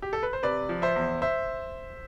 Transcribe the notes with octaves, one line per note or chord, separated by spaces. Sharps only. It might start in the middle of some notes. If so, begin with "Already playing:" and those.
G4
A4
B4
C5
C3 B4 D5
F3
C5 E5
E2
C5 E5